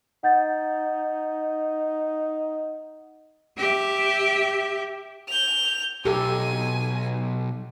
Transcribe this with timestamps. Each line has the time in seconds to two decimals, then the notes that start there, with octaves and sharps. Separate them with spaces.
0.23 D#4 F#5 G6 A6
3.57 G4 E5
5.28 G6 F7
6.05 B1 G4 A4 G#5